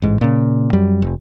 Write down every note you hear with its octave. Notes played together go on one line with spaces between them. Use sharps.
A1 G#2
A#2 C#3
F#2 G3
F1